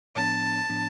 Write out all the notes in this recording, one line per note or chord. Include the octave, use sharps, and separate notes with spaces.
A2 F3 B3 D4 A5
A2 F3 B3 D4